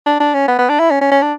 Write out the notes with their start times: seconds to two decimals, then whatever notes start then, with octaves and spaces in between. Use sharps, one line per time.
0.06 D4
0.20 D4
0.34 C#4
0.48 B3
0.59 B3
0.69 D4
0.79 E4
0.91 C#4
1.01 C#4
1.11 C#4
1.22 D4